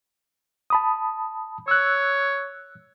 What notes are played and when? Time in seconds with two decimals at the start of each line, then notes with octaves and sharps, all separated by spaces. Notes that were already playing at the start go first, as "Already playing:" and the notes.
0.70 A5 B5 D#6
1.68 C#5 E6 F#6